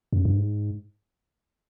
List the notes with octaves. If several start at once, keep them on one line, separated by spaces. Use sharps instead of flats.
F#2
G2
G#2